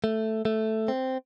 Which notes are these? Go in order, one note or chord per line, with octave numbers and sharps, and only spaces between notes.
A3
A3
C4